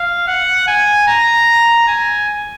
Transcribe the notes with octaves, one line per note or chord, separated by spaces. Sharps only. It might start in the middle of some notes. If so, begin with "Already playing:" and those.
Already playing: F5
F#5
G#5
A#5
G#5